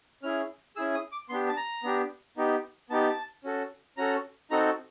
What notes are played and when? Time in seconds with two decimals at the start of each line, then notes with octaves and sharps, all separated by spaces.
0.23 C#4 E4 G#4 F6
0.76 C#4 E4 G#4 E6
0.94 D#6
1.12 D6
1.29 B3 D4 G4 C6
1.49 A5
1.57 A#5
1.83 B3 D4 G4
2.37 B3 D#4 G4
2.90 B3 D#4 G4 A5
3.44 C#4 F#4 A4
3.97 C#4 F#4 A4 A#5
4.51 C4 D#4 F#4 A4 A#5